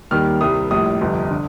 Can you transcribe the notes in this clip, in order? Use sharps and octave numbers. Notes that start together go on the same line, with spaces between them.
D#2 D#3 G3 F6
C2 C3 G3 D#6
A#1 A2 G3 D#6
G1 F2 C3
D3